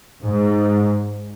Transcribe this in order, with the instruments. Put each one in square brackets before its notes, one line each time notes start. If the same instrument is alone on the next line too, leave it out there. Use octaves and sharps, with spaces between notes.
[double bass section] G#2